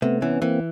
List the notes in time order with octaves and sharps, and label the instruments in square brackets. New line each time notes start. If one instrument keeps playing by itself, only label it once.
[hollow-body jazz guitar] C3 [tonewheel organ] A3 B3
[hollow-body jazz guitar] E3 [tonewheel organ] B3 C#4
[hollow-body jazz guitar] E3 [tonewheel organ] A#3 C4